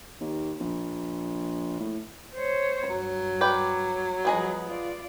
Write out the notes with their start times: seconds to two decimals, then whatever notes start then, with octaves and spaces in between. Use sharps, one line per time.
0.20 D#2
0.60 A#1
1.80 A2
2.34 C5 C#5
2.89 G2 F#3
3.41 B4 D5 G5
4.25 F3 G3 B3 G#4 D#5
4.65 F4 D5